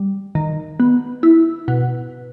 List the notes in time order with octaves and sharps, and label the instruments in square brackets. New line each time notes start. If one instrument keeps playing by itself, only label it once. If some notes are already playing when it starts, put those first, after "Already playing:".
Already playing: [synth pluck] G3
D#3
B3
E4
B2